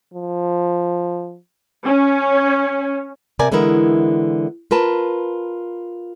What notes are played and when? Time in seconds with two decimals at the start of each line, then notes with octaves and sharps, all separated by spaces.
0.14 F3
1.85 C#4
3.39 C3 A#4 D5 G#5
3.52 D3 E3 G#3 B3 E4 A#4
4.71 F4 A#4 B4 A5